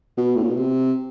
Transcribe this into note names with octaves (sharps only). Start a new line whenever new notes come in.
B2
A2
A#2
B2
C3